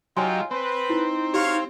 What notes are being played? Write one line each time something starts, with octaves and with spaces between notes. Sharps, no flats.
F#3 D#4 F4 G4 C#5 G#5 C6
C4 B4
D#4 E4
F#4 G4 C#5 F5